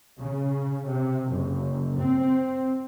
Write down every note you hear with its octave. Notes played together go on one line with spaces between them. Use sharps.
C#3
C3
F#1
C4